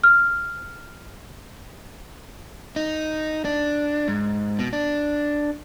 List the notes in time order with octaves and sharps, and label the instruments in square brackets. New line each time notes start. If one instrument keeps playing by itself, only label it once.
[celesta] F6
[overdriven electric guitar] D#4
D4
G#2
B2
D4